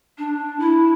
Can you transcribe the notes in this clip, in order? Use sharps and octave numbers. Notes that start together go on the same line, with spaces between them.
D4
E4